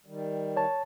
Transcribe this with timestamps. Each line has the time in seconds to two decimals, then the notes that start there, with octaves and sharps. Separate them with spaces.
0.06 D#3 G3
0.56 C#5 A5